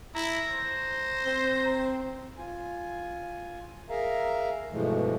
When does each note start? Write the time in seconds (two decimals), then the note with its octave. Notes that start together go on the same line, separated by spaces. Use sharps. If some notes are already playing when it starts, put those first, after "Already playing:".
0.15 E4 A#5
0.50 C5
1.26 C4
2.38 F4 G#5
3.90 G#4 A#4 E5 F5 A#5
4.71 G2 B2 E3 F3 G#3 A3